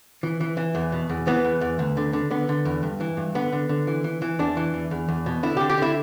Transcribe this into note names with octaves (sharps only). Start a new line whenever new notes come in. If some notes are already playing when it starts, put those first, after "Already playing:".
E3
E3
E3
E2
B2
E2
E3 B3
E2
E2
D2
D3
D3
D3 B3
D3
E2
G2
E3
G2
D3 B3
D3
D3
E3
E3
E3
E2 D4
E3
E2
E2
E2
B2
D3 E4
D3 G4
G4
D3 E4